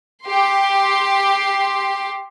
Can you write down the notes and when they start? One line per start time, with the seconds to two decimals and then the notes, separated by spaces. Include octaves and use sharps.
0.25 G4 C6